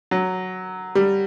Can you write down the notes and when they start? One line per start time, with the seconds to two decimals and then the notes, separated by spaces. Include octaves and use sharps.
0.11 F#3
0.95 G3